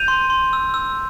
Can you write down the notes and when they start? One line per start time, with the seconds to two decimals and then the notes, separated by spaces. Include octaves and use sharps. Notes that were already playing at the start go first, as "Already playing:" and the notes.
Already playing: G6 D#7 F7
0.08 C6
0.30 C6
0.53 E6
0.74 E6